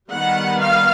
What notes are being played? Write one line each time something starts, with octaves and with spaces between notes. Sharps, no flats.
D#3 G3 B3 F#5
F5